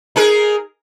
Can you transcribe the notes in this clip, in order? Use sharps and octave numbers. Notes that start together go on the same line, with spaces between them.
D#4 G#4 A#4